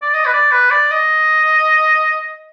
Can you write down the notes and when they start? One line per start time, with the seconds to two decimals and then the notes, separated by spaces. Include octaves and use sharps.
0.02 D5
0.14 D#5
0.26 B4
0.33 D5
0.51 B4
0.71 D5
0.91 D#5